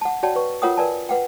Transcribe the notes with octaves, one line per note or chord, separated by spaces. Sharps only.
F#5 A5
F#4 C#5 D5 F#5 G5 A5
B4 C#6
F4 A#4 C#5 F#5 G5 D#6
A#4 B4 D5 G#5 A5
B4 F#5 G5